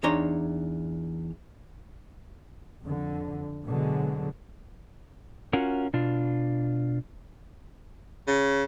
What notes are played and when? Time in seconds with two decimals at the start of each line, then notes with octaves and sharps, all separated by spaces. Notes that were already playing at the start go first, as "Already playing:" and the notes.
0.03 E2 D4 D#4 C#5 A#5 C6
2.82 F2 D3
3.65 B2 D3 F#3 G#3
5.53 C#4 F4 F#4 A#4
5.93 B2 D4 F4
8.27 C#3